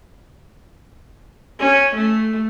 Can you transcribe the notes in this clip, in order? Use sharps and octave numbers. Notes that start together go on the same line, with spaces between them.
C#4
A3